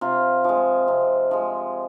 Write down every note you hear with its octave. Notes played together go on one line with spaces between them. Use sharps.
C3 F4
F3 G#3
C3
F3 G#3